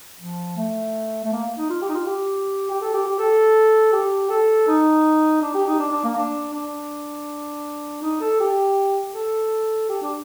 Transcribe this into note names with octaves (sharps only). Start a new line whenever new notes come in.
F3
A3
A3
A#3
D#4
F4
G4
D#4
F4
G4
G4
A4
G4
G4
A4
G4
A4
D#4
D4
G4
D#4
D4
D4
A#3
D4
D4
D#4
A4
G4
A4
G4
D4